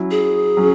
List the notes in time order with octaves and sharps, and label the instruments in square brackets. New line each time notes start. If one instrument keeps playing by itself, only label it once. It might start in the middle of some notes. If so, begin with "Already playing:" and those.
Already playing: [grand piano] F#3 C#4 E4
[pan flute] G#4
[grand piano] F#3 C#4